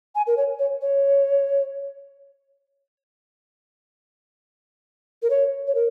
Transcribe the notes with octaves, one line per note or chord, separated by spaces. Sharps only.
G#5
A#4
C#5
C#5
C#5
A#4
C#5
C#5
A#4